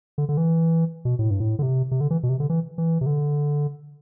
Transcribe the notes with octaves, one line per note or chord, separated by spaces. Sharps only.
D3
D3
E3
B2
A2
G2
A2
D3
C3
C3
D3
E3
B2
C3
D3
E3
E3
C3
D3